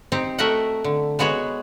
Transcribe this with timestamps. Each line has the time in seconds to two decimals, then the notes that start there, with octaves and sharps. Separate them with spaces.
0.12 C4 D#4 G4
0.38 A3 F#4 A#4 D#5 E5 F#5
0.84 D3
1.19 G#3 B3 F#4 G#4 C#5